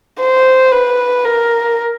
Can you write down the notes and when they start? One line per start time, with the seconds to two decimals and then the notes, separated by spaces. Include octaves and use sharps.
0.20 C5
0.72 B4
1.25 A#4